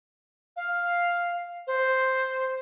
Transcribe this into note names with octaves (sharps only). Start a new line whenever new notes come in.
F5
C5